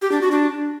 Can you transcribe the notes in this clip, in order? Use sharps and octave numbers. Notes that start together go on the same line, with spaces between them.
G4
D4
F#4
D4